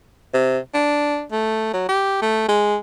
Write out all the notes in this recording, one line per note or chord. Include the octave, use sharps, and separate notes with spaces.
C3
D4
A3
F#3
G4
A3
G#3